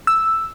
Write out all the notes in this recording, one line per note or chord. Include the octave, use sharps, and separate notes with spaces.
E6